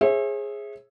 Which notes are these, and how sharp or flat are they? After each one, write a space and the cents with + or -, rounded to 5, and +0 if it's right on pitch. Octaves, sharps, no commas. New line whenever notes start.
G#4 +0 C#5 -45 E5 +0